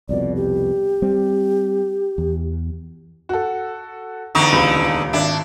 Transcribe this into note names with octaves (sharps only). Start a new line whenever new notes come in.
C2 F2 B2 D5
G4
G3 C4
E2
F#4 A4
E2 D3 D#4 C#6
D#1 C#2 B5
G#1 D4 E5